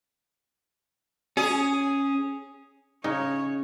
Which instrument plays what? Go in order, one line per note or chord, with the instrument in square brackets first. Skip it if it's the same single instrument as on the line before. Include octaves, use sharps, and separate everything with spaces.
[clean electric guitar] C#4 [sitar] G#4
[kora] C#3 [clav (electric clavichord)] D#4 G#4 D#5 [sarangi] C#5